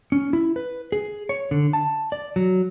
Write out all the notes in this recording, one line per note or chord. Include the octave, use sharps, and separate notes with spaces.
C#4
E4
B4
G#4
C#5
D3
A5
D5
F#3